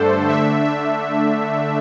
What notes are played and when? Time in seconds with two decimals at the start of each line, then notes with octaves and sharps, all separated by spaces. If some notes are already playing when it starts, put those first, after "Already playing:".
Already playing: G2 D3 A3 D4 A4 C5
0.28 D3 A3 D4 E5
0.64 E5